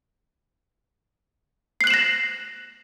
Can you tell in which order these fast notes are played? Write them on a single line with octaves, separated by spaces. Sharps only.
C7 F#6 F#7 E7 A#6